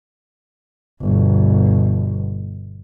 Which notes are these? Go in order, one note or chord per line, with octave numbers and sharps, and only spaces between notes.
G1 B2